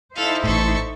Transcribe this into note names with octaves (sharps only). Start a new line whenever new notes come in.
D#4 E4 A4 C5 F5
A1 A2 A4 C#6